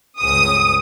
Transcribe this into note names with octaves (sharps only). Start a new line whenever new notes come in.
C#2 G2 D#6